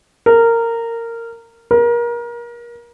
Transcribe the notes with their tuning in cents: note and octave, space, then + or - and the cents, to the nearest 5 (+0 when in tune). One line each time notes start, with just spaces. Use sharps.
A#4 -15
A#4 +30